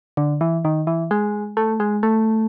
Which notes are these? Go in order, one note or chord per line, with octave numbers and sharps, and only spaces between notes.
D3
E3
D#3
E3
G#3
A3
G#3
A3